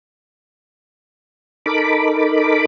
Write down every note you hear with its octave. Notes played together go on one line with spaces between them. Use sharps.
D#4 A4 A#4 B5 D6